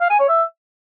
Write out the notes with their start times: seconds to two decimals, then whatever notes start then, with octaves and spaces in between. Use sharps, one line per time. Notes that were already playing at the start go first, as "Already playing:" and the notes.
0.01 F5
0.10 G#5
0.19 C#5
0.29 E5